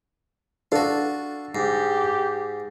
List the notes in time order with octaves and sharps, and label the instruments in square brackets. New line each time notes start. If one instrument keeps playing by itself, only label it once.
[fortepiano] D4 A4 [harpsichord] F4 F#4
[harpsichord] G#2 [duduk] G4